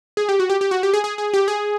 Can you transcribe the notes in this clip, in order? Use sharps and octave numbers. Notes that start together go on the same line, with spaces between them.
G#4
G4
F#4
G4
G4
F#4
G4
G#4
G#4
G#4
G4
G#4